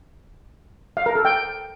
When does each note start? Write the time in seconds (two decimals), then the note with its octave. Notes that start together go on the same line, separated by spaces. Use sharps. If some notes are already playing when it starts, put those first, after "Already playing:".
0.97 F5
1.06 A#4
1.15 A4
1.25 G5